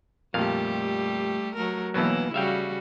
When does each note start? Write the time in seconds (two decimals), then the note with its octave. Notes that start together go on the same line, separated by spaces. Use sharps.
0.34 F2 A#2 G3 A3 G4 F5
1.56 F#3 A3 A#4
1.94 B1 B2 E3 F#3 A#3 E4
2.34 C#3 G3 F#4 E5 F5 G5